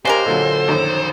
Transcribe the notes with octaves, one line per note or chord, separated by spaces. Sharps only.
C#3 G#3 G4 A#4 C5
A#2 D3 F#3 A4
A#1 F#2 D#3